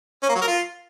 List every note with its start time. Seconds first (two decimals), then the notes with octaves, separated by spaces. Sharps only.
0.23 C#4
0.29 A#3
0.35 F#3
0.42 A#4
0.48 F4